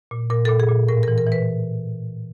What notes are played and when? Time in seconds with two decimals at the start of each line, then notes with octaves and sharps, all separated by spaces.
0.11 A#2
0.30 A#2 A#4
0.45 A#2 A4
0.60 G#4
0.69 A#2
0.89 A2 A#4
1.03 E3 A#4
1.18 A#4
1.27 E3
1.32 B4